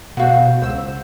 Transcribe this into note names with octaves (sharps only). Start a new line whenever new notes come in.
B2 F#4 C5 F5 F#5
C#2 C5 E6